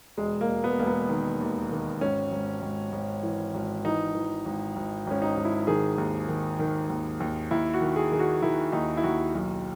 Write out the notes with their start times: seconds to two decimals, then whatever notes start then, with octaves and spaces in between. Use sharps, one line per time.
0.18 E1 G#3
0.41 A#3
0.49 E1
0.64 B3
0.79 E1 A#3
0.87 B3
1.09 D#3
1.40 D#2
1.70 D#3
2.01 G#1 C#4
2.32 G#1
2.62 G#1
2.92 G#1
3.23 E3
3.54 G#1
3.84 E3 D#4
4.15 E3
4.45 G#1
4.76 G#1
5.07 G#1 C#4
5.22 D#4
5.37 G#1
5.45 E4
5.67 D#3 G#4
5.98 D#2
6.28 D#3
6.59 D#3
6.89 D#2
7.20 D#2
7.51 D#2 E4
7.74 F#4
7.81 D#3
7.96 G#4
8.12 D#3 G#4
8.19 F#4
8.42 D#3 E4
8.72 D#2 D#4
8.97 E4
9.03 D#2 F#4
9.34 B1